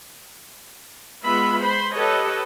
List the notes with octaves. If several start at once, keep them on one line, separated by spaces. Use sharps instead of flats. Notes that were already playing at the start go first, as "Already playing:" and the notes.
G#3 B3 F4 E5 B5
C5 B5 C6
G4 A4 B4 C#5 D#5